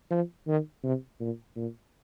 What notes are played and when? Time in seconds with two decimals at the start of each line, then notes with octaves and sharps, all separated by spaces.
0.11 F3
0.47 D#3
0.83 C3
1.20 A#2
1.56 A#2